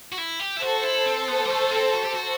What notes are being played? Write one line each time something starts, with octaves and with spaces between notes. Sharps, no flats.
F#4
E4
G4
E4
F#4 A4 C5
E4
C4
B3
G3
A3
C4
F#4
G4
F#4